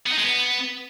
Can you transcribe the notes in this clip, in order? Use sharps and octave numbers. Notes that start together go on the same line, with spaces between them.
B3
D#4
G#3
B3